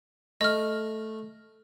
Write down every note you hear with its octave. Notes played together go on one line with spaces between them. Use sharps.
A3 D#5 F6